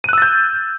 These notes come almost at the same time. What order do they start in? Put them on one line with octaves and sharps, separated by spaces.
D#7 F#6 E6 A6 G6